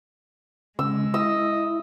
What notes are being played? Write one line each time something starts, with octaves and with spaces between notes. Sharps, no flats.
C#3 G#3 E6
E4 D#5 E6